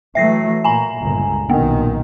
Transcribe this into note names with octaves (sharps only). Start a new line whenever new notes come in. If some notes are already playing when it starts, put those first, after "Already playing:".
E3 F#3 A3 E5 A#6 C7
A#2 G#5 A#5
G1 C#2 A#2
B1 A#2 D#3 A#3 B3